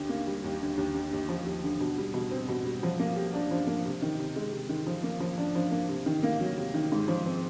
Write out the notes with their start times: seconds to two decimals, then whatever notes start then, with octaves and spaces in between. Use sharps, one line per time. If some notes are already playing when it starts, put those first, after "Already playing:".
Already playing: D#2 D3
0.09 A#3
0.27 G3
0.44 D#2
0.61 D3
0.77 D#2
0.94 D3
1.13 D#2
1.29 F3
1.46 D#2
1.63 D3
1.80 B2
1.98 G3
2.14 B2
2.31 C4
2.49 B2
2.65 G3
2.83 F3
2.99 A#3
3.16 G4
3.34 D4
3.51 F3
3.67 A#3
3.85 C3
4.02 D#3
4.19 C3
4.36 G#3
4.53 C3
4.69 D#3
4.87 F3
5.03 A#3
5.20 F3
5.38 D4
5.55 F3
5.71 A#3
5.89 C3
6.06 D#3
6.23 A#3
6.40 F#3
6.58 C3
6.74 D#3
6.92 G#2
7.08 F3
7.26 C4